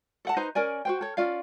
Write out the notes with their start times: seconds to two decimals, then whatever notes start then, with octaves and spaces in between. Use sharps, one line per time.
0.25 A4 F#5 A5
0.37 D#4 B4 C5 A#5
0.55 C#4 A#4 D5 G#5
0.85 F#4 C5 G5
1.01 A4 C#5
1.17 C#4 F4 D5 F5